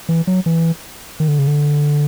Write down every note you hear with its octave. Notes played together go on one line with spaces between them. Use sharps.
E3
F#3
E3
D#3
D3
C#3
D3